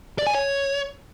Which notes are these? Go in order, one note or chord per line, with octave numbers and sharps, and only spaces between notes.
D5
G#5
C#5